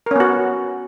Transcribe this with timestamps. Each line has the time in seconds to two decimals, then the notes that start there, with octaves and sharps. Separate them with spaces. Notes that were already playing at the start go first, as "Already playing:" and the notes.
0.06 A#4
0.11 C#4
0.16 B3
0.20 F#4